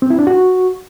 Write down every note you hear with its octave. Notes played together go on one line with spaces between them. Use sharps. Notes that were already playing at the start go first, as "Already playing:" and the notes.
C4
E4
D4
F#4